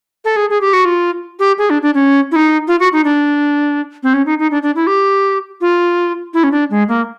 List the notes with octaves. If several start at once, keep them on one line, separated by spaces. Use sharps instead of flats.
A4
G#4
G#4
G4
F#4
F4
G4
G#4
D4
D4
C#4
E4
D#4
F4
F#4
D#4
D4
C4
C#4
D#4
D#4
D4
D4
E4
G4
F4
E4
C#4
D4
G#3
A#3